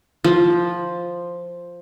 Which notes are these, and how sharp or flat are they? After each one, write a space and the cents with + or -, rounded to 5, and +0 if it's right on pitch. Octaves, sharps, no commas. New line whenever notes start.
F3 +0